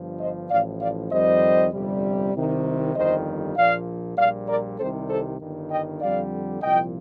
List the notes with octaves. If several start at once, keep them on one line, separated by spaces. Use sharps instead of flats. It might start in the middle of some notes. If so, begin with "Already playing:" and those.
Already playing: G1 G2 F3
C5 D#5
A1 A2 F3 D5 F5
D5 F5
F2 D#3 G3 C5 D#5
G1 F2 C3 G3
C2 C3 D#3
G1 F2 D#3 G3 C5 D#5
A#1 A#2 F3 D5 F5
A#1 A#2 G3 D5 F5
A#4 D5
C2 C3 D#3 G3 A4 C5
A4 C5
G1 G2 D#3
D#5 G5
F2 D3 G3 D5 F5
C2 A#2 F3 D#5 G5